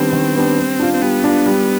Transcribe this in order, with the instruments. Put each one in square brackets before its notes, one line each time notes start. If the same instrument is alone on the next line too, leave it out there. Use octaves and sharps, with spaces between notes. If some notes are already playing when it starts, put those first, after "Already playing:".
Already playing: [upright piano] D#3 G3 B3 D4 [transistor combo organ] C4
[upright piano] D#3
G3 B3 D4
G3
D4 F4
[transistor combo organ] C4
[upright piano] G3 [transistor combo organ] B3
[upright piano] D4 F4
G3